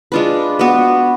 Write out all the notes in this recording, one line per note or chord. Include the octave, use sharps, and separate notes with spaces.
G#3 D4 F4 B4
B3 F#4 B4